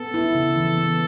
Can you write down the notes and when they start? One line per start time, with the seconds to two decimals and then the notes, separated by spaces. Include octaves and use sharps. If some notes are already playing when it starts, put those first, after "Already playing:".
Already playing: B3 A4
0.14 E4
0.35 C#3
0.56 E3
0.77 B3